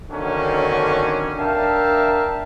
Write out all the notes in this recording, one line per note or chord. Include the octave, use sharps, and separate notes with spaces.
D3 D#3 F#3 A#3 C4 C#4
D4 A#4 E5 F5 G5 A5